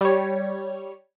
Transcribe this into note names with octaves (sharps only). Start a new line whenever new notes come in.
G3 C#5